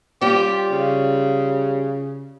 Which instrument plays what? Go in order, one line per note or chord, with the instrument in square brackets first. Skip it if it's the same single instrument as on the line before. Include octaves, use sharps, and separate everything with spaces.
[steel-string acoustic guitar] G3 C#4 F4 [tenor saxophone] G4
[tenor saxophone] C#3